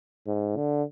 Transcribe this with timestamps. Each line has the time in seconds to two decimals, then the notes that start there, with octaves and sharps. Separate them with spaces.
0.27 G#2
0.57 D3